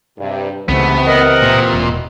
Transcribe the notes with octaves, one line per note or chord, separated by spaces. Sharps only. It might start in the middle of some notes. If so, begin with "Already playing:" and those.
G2 C3
C#2 G#2 C3 E3 A3 B3 C4
A#4 D#5 F#5
A#2
E1 B2